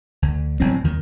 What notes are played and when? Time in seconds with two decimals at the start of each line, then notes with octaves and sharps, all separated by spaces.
0.22 D2
0.60 G1 A2 F#3 C4
0.84 D#2 D#3